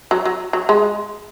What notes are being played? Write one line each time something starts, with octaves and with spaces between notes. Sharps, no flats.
F#3
F#3
F#3
G#3